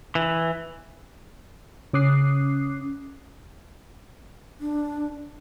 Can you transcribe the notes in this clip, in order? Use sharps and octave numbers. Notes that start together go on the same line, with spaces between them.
E3
C#3 C#4 D6 D#6 F#6 C7
D4